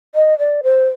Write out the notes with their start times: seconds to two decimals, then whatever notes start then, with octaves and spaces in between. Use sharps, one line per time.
0.15 D#5
0.39 D5
0.63 C5